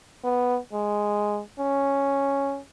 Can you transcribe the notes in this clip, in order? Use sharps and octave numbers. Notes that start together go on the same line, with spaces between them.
B3
G#3
C#4